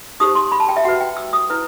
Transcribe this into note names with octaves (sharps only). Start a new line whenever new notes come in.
D#4 G4 C5 D#6
C6
B5
A5
G5
E5
F#4 B4 F#5
G5
E6
D#6
E4 B4